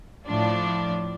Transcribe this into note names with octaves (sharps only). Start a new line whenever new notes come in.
A2 F3 D4 F4